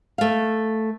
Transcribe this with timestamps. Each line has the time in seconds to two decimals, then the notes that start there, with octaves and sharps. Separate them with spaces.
0.18 A3 F5